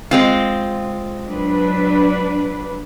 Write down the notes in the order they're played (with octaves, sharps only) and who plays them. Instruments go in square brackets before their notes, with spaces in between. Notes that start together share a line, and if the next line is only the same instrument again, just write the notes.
[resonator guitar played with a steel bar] G#3 C4 F4
[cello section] F#3 D4 B4